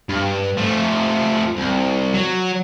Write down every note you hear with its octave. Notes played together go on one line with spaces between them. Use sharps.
G2
F3 A3
C2
F#3